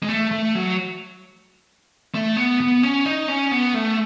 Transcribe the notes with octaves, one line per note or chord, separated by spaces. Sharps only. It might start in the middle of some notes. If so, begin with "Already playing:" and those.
G#3
A3
A3
F#3
A3
B3
B3
C#4
D#4
C#4
B3
A3